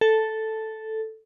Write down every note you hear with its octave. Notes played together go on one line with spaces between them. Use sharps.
A4